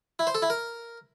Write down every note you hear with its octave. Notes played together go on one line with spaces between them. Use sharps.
E4
C5
A4
E4
A#4